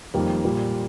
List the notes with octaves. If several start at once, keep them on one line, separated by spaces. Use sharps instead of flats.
F2 D#3 G3 A#3
A#2 G3 A#3 F4